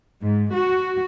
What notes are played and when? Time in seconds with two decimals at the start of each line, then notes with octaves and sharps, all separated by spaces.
0.22 G#2
0.53 F#4